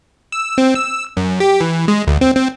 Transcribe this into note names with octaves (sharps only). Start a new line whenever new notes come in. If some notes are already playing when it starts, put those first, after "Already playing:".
E6
C4
E6
F#2
G4
E3
G#3
D2
C4
C4